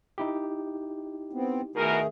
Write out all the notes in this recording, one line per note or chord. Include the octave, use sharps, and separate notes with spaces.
D#4 E4 G4
B3 C4
B2 D#3 A3 G#4 A#4